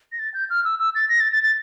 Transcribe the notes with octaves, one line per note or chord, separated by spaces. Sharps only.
A#6
A6
G6
F6
E6
E6
A6
A#6
A6
A6
A6